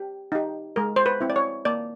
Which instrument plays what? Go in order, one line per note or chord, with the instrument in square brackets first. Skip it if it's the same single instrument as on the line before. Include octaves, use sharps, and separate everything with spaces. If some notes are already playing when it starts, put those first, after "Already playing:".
Already playing: [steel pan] G4
D#4 G4
G#3 A#4
C5
B4
C4 E4
D5
C#5
A#3 D5